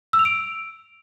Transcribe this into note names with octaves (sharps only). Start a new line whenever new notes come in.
E6
F7
D7